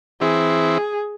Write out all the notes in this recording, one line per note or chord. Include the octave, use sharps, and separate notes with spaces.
E3 C4 E4 G#4